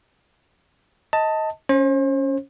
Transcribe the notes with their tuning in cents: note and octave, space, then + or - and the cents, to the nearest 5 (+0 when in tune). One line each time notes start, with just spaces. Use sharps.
D#5 +20 A5 +15
C#4 +0 C5 +40